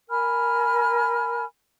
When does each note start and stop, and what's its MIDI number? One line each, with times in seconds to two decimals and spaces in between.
0.09 1.45 70
0.09 1.45 80
0.09 1.45 83
0.09 1.45 89